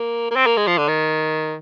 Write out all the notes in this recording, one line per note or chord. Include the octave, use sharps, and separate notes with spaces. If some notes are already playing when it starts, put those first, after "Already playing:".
Already playing: A#3
A#3
C4
A#3
G#3
F3
D3
D#3